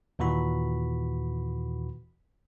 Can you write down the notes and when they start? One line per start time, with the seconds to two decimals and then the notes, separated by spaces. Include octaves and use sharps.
0.19 D#2 A#2 E3 F#4 B5